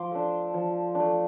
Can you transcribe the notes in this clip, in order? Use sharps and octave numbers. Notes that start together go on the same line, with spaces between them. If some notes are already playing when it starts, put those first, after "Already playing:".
Already playing: F3 C6 D6
A3 D4
F3
A3 D4